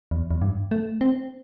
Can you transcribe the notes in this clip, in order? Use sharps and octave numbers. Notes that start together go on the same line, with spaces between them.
E2
E2
G2
A3
C4